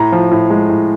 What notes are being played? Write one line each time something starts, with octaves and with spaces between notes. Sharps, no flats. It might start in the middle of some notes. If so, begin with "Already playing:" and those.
Already playing: A2 A#5
F3
A2
G#3
A2